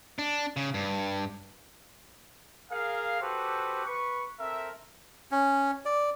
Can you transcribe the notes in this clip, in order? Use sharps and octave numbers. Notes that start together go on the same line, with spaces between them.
D4
C#3
G2
G#4 A#4 F5
F#4 G4 A4 B4 C5
B4 C#6
C4 A4 A#4 E5
C#4
D5